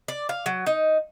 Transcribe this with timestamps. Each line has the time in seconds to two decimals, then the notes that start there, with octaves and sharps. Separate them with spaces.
0.08 D5
0.29 F5
0.46 F#3
0.66 D#4